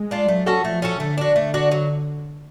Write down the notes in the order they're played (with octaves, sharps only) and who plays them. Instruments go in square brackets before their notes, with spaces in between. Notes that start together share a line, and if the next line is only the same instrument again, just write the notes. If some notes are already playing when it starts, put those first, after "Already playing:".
Already playing: [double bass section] G#3
[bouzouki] D4 F4
[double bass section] F#3 [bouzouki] A3
[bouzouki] C#4 F#4 A4
[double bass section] F3 [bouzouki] A3
[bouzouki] C#4 F#4 A4
[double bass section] D3 [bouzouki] A3
[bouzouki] D4 F#4
[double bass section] D3 [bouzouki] A3
[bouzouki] D4 F#4
F#3